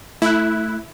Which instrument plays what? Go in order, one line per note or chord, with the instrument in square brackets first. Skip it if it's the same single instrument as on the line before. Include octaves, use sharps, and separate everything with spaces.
[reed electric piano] A3 F#6 [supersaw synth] E4